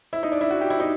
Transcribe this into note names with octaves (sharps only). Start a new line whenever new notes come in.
E4
D#4
D4
E4
F#4
G4
E4
D#4